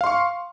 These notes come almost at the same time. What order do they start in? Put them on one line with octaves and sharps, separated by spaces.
F5 C6 C#6